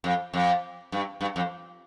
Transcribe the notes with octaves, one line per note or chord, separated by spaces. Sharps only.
F2
F2
G2
G2
F2